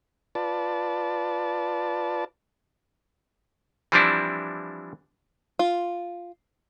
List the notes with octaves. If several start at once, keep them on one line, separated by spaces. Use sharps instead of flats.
F4 B4 D5 A5
E3 F3 G3 C4 D4 E4
F4